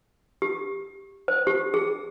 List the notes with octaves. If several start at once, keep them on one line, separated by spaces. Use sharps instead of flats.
G4
C5
G4
G#4